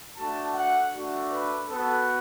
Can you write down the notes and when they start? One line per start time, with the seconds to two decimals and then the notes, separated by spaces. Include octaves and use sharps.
0.17 A3 D4 F#4 A5
0.55 F#5
0.93 A3 D4 F#4
1.31 B4
1.68 B3 F#4 A4